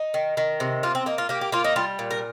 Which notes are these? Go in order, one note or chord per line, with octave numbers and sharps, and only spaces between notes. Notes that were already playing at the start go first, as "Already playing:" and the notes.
Already playing: D#4
D#3
D#3
C3
A#3 F4
C4
A#3 D#4
F4
A#3 G4
G4
A#3 F4
D#4
G3 F4
A#2
A#4